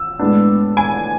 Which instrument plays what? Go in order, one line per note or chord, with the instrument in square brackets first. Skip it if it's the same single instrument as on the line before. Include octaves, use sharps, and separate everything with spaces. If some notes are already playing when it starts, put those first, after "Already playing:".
Already playing: [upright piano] E6
A2 G#3 B3 D4
G#5